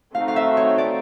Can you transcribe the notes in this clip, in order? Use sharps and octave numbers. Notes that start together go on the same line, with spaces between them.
A3 C4 D#4 F#4 F5
F5
E5
C#5
D5